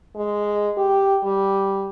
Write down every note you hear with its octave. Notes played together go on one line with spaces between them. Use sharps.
G#3
G4
G3